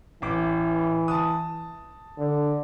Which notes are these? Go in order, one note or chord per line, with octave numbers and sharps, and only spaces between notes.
A1 E3 D6
A5 D#6
D3